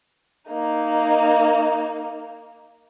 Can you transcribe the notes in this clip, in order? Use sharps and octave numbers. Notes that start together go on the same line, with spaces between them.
A#3 D#4